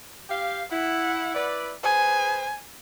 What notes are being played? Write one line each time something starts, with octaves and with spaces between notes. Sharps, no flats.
G4 F5
E4 F#5
E4 B4 D5
G#4 B4 C5 G#5